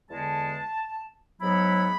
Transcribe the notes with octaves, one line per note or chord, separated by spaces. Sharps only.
E2 D3 G#3 A5
G#2 F#3 B3 E4 B5